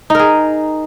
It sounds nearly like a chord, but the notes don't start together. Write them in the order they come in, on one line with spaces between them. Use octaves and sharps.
D#4 A#4 G#4